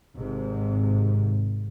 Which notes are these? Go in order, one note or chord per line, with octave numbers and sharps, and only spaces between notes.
G#1 G#2 C3